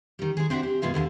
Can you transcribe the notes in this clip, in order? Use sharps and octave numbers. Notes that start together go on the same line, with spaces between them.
D#3 G3
G#3 G#4
C4 D4 E4 F#4 E5
G4
F#2 B2 G#3 F4 E5
D#2 D3 G#5 A5